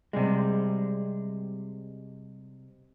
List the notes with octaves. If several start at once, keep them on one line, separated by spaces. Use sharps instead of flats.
C3 G3 G#3